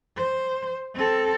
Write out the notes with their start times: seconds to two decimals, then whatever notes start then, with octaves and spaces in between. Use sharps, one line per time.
0.17 C5
0.95 C4 A4